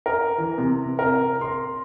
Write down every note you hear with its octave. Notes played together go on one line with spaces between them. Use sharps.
A#4
E3
C3
A#4
C6